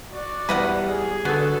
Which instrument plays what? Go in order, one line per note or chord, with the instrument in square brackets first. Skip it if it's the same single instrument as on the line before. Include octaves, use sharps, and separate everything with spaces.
[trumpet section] F#4 D5
[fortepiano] E2 [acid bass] G3 [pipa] B4 D#5 F#5
[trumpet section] G#4
[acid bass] D3 [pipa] B3 [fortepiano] F#4 A4